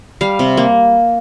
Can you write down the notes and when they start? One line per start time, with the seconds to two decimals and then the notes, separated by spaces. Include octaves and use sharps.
0.21 G3 F5
0.39 C3
0.57 A#3